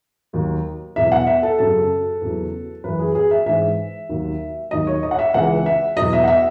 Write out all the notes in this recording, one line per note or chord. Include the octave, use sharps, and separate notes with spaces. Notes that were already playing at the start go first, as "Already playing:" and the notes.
D#2 D#3 F#3
E2 B2 F#3 E5
F#5
E5
A4
F#2 C#3 F#3 A4
E2 C#3 F#3
F#2 E3 B4
G#4
G#4
E5
G#2 E3 E5
D#2 D#3 F#3
D#2 D#3 F#3 D#5
C#5
D#5
F#5
E5
C#2 C#3 E3 F#5
E5
E2 B2 F#3 D#5
E5
F#5
E5